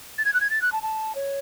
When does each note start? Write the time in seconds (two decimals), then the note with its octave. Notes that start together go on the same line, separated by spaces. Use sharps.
0.18 A6
0.25 G#6
0.34 F#6
0.41 G#6
0.50 A6
0.62 F#6
0.72 A5
0.83 A5
1.15 C#5